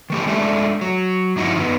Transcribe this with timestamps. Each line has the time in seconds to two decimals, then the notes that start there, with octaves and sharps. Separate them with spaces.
0.10 D#3 A3 G4
0.27 G#3 A3 D4 E5
0.81 F#3
1.36 G2 F3 D#4 E4 F#4
1.56 D#3 B3